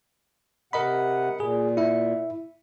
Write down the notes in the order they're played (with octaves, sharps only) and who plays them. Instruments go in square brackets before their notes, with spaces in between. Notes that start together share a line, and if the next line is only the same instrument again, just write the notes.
[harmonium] C3 F#5 [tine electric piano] A#4 D#5 B5
[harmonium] A#2 [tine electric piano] G#4
[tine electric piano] E4 E5